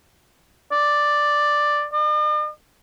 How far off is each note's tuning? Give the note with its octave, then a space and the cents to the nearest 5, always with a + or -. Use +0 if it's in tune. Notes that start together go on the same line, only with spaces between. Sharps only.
D5 +5
D5 +45